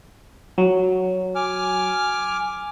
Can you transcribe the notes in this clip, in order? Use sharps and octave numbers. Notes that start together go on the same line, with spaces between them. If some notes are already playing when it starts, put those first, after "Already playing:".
F#3
G#5 D6 F6